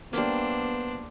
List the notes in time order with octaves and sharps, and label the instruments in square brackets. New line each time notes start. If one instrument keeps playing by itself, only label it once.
[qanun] G3 A#3 [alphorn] B3 [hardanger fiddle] D4 C5